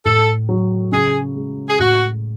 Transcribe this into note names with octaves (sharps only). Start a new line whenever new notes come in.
A2 A4
F#3
C#3 G#4
G#3
G#4
A2 F#4